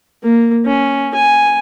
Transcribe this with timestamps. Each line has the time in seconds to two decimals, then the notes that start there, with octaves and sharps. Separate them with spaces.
0.23 A#3
0.65 C#4
1.15 G#5